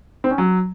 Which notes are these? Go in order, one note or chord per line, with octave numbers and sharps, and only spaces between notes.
C4
C#4
F#3